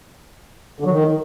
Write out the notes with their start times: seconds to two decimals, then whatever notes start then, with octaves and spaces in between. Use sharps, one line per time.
0.80 D3
0.85 F#3
0.90 D#3